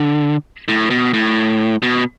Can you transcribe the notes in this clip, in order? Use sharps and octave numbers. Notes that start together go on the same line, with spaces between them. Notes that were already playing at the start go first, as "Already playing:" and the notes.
Already playing: D3
A2
B2
A2
B2